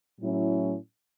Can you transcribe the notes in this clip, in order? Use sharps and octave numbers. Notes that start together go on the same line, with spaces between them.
A2 F#3 C#4 E4